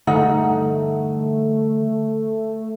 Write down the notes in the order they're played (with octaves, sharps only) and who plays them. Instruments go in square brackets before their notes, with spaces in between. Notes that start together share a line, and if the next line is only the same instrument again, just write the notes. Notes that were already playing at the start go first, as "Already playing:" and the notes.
[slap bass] D3 E3 G3 [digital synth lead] A3 [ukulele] D#4 F#5